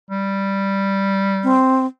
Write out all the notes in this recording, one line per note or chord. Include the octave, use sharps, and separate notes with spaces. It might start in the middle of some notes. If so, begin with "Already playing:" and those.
G3
C4